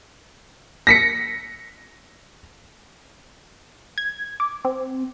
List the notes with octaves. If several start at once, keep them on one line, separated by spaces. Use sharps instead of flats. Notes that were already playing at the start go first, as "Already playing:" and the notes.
A#6 B6 C#7
G#6
D6
C4